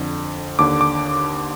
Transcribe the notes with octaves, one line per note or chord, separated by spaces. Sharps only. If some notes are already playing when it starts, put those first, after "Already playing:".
Already playing: F2 D3
D#2 D3 D6
D6